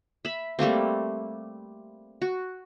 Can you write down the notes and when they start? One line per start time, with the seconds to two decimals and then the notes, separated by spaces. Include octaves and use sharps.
0.25 E5 B5
0.59 G3 A3 A#3 C4
2.22 F#4